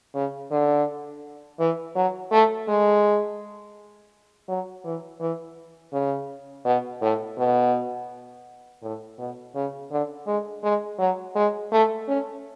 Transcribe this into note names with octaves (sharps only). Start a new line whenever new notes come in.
C#3
D3
E3
F#3
A3
G#3
F#3
E3
E3
C#3
B2
A2
B2
A2
B2
C#3
D3
G#3
G#3
F#3
G#3
A3
C#4